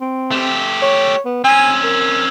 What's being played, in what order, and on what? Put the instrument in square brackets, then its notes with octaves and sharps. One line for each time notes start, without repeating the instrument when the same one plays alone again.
[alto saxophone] C4
[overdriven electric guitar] A3 G4
[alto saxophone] C#5
B3
[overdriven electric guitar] C4 C#4 [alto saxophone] G#5
[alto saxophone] A#4